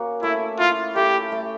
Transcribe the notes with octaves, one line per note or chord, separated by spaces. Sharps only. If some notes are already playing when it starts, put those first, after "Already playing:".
Already playing: A#3 C#4 F#4
A3 E4
E4 F4
A3 G4
A3